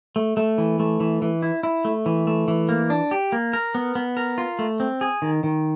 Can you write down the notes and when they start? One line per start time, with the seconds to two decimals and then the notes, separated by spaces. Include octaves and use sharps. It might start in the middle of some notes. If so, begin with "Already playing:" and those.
0.16 A3
0.37 A3
0.58 E3
0.80 A3
1.00 E3
1.22 E3
1.42 E4
1.63 E4
1.85 A3
2.06 E3
2.27 A3
2.48 E3
2.69 A#3
2.90 D4
3.11 G4
3.32 A#3
3.53 A#4
3.75 B3
3.95 B3
4.17 A#4
4.38 F4
4.59 A3
4.80 C4
5.01 G#4
5.22 D#3
5.44 D#3